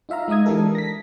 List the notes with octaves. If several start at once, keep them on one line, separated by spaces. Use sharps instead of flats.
D#4 F4 E5 F5 A#5
G#3 D#4 E5 D#6 G#6
E3 G#3 D4 G4 A4 A#4
A#6 B6